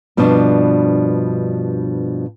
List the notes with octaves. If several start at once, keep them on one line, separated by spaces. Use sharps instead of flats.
G2 B2 F3 B3 C4 D4